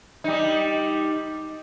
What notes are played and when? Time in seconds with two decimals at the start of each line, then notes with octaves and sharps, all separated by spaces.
0.24 G3 D#4